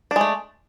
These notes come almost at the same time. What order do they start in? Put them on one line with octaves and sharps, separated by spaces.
D4 G#3 A3